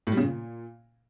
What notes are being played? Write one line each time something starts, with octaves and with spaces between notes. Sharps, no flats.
A2
G3
C#3
A#2